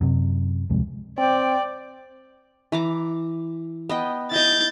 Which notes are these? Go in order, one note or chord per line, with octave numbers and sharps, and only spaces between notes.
F#2 C3
D1 C2 F2 G#3
C4 D5 G5
E3 A#5 D6
B3 D#5 G5
E4 D#5 G6 A6